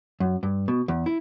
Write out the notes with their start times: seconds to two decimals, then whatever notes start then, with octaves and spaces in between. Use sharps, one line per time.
0.20 F#2
0.43 G2
0.68 B2
0.88 E2
1.06 E4